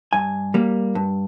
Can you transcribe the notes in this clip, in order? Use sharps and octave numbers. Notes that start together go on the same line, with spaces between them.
G2 G#5
G3 A#3
G2